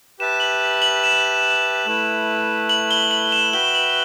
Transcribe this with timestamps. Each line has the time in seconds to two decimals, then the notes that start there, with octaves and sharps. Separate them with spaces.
0.19 G4 B4 E5 A5 E7
0.40 F#7
0.82 F#7
1.04 E7
1.86 A3 E4 B4
2.69 F#7
2.91 G7
3.11 F#7
3.32 E7
3.53 F#4 B4 E5 G5 G7
3.75 F#7